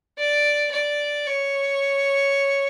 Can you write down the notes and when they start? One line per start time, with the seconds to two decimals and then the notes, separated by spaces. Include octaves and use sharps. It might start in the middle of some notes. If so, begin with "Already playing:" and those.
0.19 D5
0.72 D5
1.27 C#5